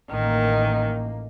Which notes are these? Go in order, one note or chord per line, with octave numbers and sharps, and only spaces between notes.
A1 D#3 A#3